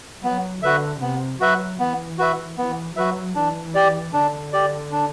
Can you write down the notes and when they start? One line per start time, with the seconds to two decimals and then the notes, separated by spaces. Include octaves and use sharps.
0.23 F#3 B3
0.62 D3 F#4 B4 E5
1.01 C3 B3
1.40 F#3 F#4 B4 E5
1.79 E3 B3
2.18 F#4 B4 E5
2.58 E3 B3
2.96 F#3 F#4 B4 E5
3.35 E3 D4
3.75 G4 D5
4.13 D3 D4
4.53 G4 D5
4.92 D4